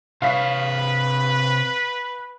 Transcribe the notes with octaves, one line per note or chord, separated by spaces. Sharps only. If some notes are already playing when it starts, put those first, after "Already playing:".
C3 B4 C#5 F5 B6